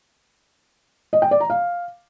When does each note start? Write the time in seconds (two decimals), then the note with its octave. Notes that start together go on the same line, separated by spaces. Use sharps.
1.13 D#5
1.22 G5
1.31 D5
1.40 A#5
1.50 F5